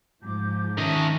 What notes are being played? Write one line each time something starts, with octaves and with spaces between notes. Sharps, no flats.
G#2 F3 D6 G6
D#3 C#4 D#5 E5 A5